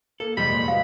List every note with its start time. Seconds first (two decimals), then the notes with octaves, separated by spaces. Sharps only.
0.20 A#3 A4
0.37 C2 F2 G3 G#3 B5
0.49 F#1 A#2
0.68 F#4 B4 D#5 F5